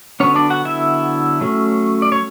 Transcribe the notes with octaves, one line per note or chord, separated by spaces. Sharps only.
D3 F#3 B3 C#4 C#5
D4 D5
F#4 F#5
E4 E5
F#3 A3 C#4
D5
C#5